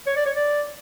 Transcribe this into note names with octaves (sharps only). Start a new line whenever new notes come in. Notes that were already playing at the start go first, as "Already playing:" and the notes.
C#5
D5
C#5
D5